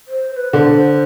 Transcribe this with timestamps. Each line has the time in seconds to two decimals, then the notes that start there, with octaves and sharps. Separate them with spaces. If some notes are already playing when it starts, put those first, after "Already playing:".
0.08 C5
0.31 C5
0.36 B4
0.53 D3 C5